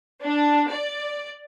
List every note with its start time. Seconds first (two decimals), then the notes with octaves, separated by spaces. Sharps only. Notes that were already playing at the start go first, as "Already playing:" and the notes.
0.23 D4
0.68 D5